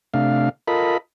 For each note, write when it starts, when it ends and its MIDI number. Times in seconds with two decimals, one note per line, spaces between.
0.14 0.49 48
0.14 0.49 57
0.14 0.49 62
0.14 0.49 77
0.68 0.97 65
0.68 0.97 69
0.68 0.97 70
0.68 0.97 75
0.68 0.97 83